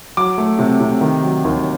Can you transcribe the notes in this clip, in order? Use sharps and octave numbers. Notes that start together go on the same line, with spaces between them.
F#3 D6
A3
C3
C3
D#3
F#3
D#2